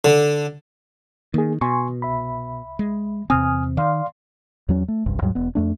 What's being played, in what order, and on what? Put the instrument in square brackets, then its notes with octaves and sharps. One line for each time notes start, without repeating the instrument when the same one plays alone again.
[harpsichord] D3
[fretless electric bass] D#3 [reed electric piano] A#3 G#4
[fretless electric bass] B2 [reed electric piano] G#5 C6 C#6
[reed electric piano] C2 E5 B5
[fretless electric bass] G#3
[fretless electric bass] E2 C3 C4 [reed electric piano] G#5 D#6 F6
[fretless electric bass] D#3 [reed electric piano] D5 F5 C6
[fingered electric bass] E2 F#3 C#4
A3
F#1 C2 G2
D#2 G#2 F#3 G3
E1 B3
F2 A3 D4